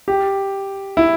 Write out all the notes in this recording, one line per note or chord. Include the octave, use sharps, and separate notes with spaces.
G4
E4